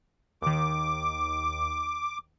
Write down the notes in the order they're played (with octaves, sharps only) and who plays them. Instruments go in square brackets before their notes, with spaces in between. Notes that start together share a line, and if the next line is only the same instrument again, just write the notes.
[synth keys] D#2 D#3 [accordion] D6